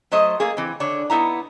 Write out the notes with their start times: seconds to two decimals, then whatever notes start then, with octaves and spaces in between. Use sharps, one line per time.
0.12 F#3 A3 C5 D#5
0.40 A3 A#3 G#4
0.57 E3 C4
0.80 D3 D4 C#5
1.10 B3 D#4 E4 A#5